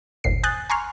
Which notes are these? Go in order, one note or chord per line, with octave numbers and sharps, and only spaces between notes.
G1 D#2 A#2 C7
G#5 D#6 F#6 G6 A6
G#5 A#5 C6 C#6 F6